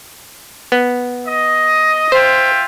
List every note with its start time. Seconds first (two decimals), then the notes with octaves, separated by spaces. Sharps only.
0.72 B3
1.27 D#5
2.12 F4 C5 E5 G5